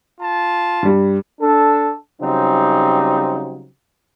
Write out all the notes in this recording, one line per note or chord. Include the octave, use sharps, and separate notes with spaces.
F4 A5
G2 G3
D4 A4
C#3 F#3 G3 C4 D#4